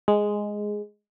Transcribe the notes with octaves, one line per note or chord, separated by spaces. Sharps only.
G#3